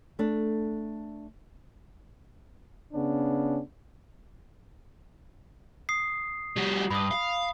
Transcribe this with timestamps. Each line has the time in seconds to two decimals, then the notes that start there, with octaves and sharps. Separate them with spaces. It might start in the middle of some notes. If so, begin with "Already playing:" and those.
0.19 A3 D4
2.94 C#3 B3 C#4 D4
5.89 D#6 C7
6.56 G3 F#4
6.90 G2 B5 D#6
7.11 F5